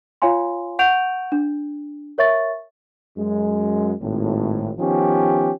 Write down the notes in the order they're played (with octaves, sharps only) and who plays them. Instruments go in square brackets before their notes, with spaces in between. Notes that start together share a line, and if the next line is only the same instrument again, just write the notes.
[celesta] F4 C#5 F5 G#5 C6
F#5 C#6 G6 D7 F7
D4
A#4 C#5 E5 C#6 A6
[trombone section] F#2 G#3
G#1 A2
D#3 F3 B3 C#4 G4